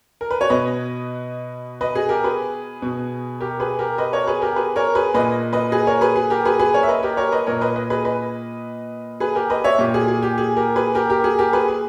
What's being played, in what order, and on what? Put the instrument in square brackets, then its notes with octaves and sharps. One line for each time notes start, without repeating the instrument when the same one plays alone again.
[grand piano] A#4
B4
C#5
B2 B4 D#5
B4 D#5
G#4
G4 A#4
G#4 B4
B2
G4 A#4
G#4 B4
G4 A#4
B4 D#5
A#4 C#5
G#4 B4
G4 A#4
G#4 B4
A#4 C#5
G#4 B4
A#2 B4 D#5
B4 D#5
G#4 B4
A#4 C#5
G#4 B4
G#4
G4 A#4
G#4 B4
G#4 B4
A#4 C#5
E5
B4 D#5
G4 A#4
A#4 C#5
B4 D#5
A#2 A#4 C#5
B4 D#5
B4 D#5
G#4 B4
B4 D#5
G#4 B4
G4 A#4
B4 D#5
C#5 E5
A#2 G4
G#4
G#4
G4
G#4
G4 A#4
G#4 B4
G4 A#4
G4 A#4
G#4
G4 A#4
G#4 B4
G#4